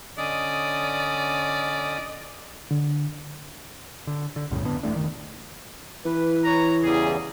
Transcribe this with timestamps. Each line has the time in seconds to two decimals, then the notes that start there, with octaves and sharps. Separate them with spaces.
0.18 D3 C#4 D5 D#5 D#6
2.71 D3
4.07 D3
4.36 D3
4.50 C2 F#2 A2 C#3
4.65 F2 D3 B3 D4
4.83 E1 E3 A3 D4
4.96 F1 D#3
6.06 E3 B4
6.43 C#5 A#5
6.82 E2 C#3 G3 G#4